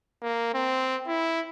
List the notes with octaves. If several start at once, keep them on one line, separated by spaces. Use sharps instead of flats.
A#3
C4
E4